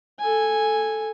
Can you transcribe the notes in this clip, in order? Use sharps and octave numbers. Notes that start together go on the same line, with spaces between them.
A4 G#5